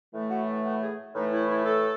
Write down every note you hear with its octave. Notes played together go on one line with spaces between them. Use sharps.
A2 E3 A3
F#4
E4
F#4
G#4
A2 E3 A3 D#4
E4
E4
A4